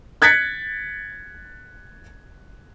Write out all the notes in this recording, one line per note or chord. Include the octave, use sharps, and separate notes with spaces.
F#6 G#6 A6 B6 C#7